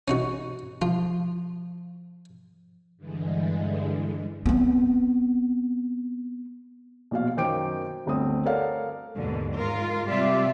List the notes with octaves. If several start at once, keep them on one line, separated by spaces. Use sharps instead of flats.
C#4 D#4 F#4
F3 F4
G2 D3 E3 G#3
B3 C4
A#1 B2 F5
F#2 D#3 C5 G5 D6 D7
G1 D2 C4 D#6
A4 A#4 C#5 D5 F5 F#5
D#2 G#2 B2 D3
G#2 G#3 F4 A#4
C3 G3 F4 G4 D5 E5